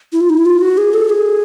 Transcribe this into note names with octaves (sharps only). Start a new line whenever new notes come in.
E4
F4
D#4
E4
F4
F#4
G#4
A4
G#4